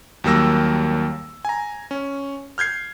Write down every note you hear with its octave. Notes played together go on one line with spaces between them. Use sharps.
D#2 F#3 G3 A#3 E6 A#6
G#5 A#5
C#4
F6 G6 G#6 C7